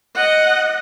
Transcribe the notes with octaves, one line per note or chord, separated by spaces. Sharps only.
D#5 F#5